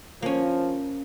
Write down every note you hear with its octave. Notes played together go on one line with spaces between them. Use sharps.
F3 A#3 C#4